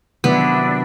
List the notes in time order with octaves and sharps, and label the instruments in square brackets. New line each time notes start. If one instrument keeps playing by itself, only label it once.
[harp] C3 D#3 F#3 [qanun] B3 [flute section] D4 E4